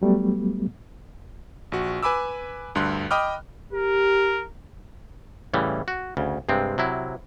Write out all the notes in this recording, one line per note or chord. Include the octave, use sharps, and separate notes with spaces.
F#3 G3 A3 B3
A#1 F#4
B4 G#5 B5 D6 E6
D2 G2 C6 F#6
D#5 G5 B5 D6 D#6 F6
G4 A#4
A2 C#3 E3 G3
F#4
D2 C#3
G2 C3 G#3 C4
C3 F#3 E4